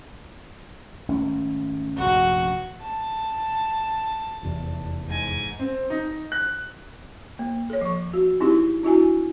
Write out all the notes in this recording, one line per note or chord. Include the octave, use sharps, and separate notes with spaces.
G#1 A3 C#4
F1 A#1 F#2 F#4
A5
F1 E2
G#2 G#5
C4
D#4
F#6
A#3
A4 C#5
F3 C#6
F#4
C4 D#4 E4 G4
D4 E4 F#4 G#5